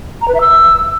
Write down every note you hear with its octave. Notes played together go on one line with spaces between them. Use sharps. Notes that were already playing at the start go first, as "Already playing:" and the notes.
A#5
B4
E5
E6